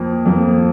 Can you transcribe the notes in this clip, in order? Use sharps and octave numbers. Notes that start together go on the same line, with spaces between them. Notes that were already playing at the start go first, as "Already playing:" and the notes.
Already playing: F2 F3 A#3
F2 F3 A#3